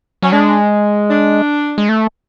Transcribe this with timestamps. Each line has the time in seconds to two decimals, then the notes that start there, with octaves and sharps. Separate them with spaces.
0.23 F#3 C#4
0.32 G#3 D4
1.10 D4
1.78 G#3
1.89 A3